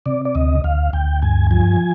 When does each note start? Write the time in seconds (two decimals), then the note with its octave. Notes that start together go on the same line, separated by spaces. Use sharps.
0.06 C3 D5
0.25 D5
0.35 D2 D#5
0.64 D2 F5
0.93 D2 G5
1.22 G2 G#5
1.51 F3 G#5